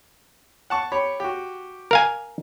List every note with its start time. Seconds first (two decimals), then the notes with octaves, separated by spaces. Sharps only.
0.70 F#5 A5 C#6
0.92 G4 C#5 B5
1.20 F#4 G4
1.91 A#4 F5 G#5